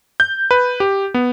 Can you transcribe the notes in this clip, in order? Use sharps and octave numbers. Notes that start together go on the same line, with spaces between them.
G6
B4
G4
B3